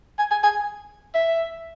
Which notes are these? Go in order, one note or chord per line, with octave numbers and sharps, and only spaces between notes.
G#5
G#5
G#5
E5